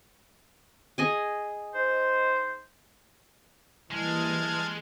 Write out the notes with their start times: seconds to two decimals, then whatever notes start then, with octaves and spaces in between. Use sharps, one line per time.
0.98 G#4 D#5 G#5
1.74 D#4 C5
3.92 E3 G3 G#3 A#3 A5 F6 G#6